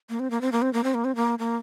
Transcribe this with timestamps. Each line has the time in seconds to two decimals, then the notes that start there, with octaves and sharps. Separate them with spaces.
0.10 A#3
0.20 C4
0.31 A#3
0.41 C4
0.52 A#3
0.62 C4
0.73 A#3
0.84 C4
0.94 A#3
1.04 C4
1.16 A#3
1.39 A#3